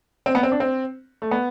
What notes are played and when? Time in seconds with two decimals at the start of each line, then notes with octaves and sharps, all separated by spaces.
0.26 C4
0.35 B3
0.43 C4
0.52 D4
0.60 C4
1.22 A3
1.31 B3